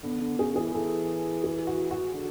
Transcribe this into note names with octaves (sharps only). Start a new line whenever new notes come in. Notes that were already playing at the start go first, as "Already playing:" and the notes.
D3 B3
D3
C#3 G#4
E3 G#4
E3 A4
G#4
F#4
F#4
D3